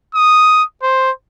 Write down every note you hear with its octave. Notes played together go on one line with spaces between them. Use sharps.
D#6
C5